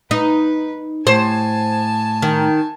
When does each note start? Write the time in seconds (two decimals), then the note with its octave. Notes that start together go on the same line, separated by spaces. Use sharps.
0.11 D#4 B4
1.07 A2 C5 G#5 A5
2.22 D#3